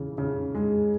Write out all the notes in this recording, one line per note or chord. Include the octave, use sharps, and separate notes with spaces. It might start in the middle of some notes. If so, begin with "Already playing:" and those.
Already playing: C#3 E3
C#3
G#3